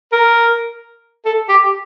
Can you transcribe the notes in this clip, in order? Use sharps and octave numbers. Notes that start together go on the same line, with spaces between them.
A#4
A4
G4